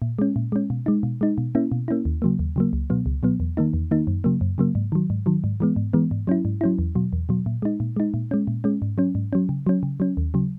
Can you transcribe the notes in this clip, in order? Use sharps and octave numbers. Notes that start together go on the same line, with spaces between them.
A#2
G#3 C#4
A#2
G#3 C#4
B2
G#3 D#4
B2
G#3 D#4
B2
A#3 C#4 E4
B2
A#3 C#4 E4
D#2
C#3 F#3 A#3
D#2
C#3 F#3 A#3
C#2
B2 F#3 B3
C#2
B2 F#3 B3
E2
D#3 A#3 D#4
E2
D#3 A#3 D#4
F#2
C#3 F#3 A#3
F#2
C#3 F#3 A#3
G#2
D#3 F#3
G#2
D#3 F#3
G#2
E3 G#3 B3
G#2
E3 G#3 B3
G#2
F#3 C#4 E4
G#2
F#3 C#4 E4
E2
B2 F#3
E2
B2 F#3
A#2
G#3 D#4
A#2
G#3 D#4
A#2
G#3 C#4
A#2
G#3 C#4
G#2
F#3 C#4
G#2
F#3 C#4
C#3
F#3 C#4
C#3
F#3 C#4
D#2
C#3 F#3